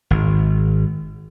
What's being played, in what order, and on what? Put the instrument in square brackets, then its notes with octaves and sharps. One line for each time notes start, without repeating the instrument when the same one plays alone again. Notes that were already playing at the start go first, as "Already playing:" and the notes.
[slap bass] G#1